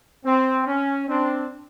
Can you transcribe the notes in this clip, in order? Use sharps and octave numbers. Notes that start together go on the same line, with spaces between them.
C4
C#4
C4 D4